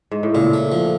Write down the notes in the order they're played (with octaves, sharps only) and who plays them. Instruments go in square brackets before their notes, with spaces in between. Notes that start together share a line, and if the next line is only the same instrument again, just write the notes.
[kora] G#2
A2
[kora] A#2 [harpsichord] C#3
[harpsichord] A3
F3